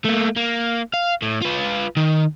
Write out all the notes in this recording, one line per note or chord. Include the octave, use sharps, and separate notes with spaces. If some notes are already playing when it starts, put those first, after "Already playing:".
A3 A#3
A#3
F5
A2
F4 B4
D#3